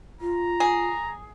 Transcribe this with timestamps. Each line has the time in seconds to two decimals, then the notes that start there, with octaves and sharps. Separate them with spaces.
0.21 F4 A#5
0.60 G#4